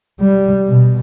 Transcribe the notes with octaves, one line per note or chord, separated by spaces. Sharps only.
G3
B2